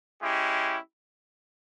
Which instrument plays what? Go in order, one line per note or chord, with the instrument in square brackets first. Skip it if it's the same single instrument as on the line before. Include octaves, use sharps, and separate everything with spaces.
[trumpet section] G#3 C#4 E4 G4